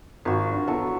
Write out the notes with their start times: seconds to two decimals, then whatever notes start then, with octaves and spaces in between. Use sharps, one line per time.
0.25 G#1 F4 F#4
0.51 G2
0.68 E3 F#3 B3 A4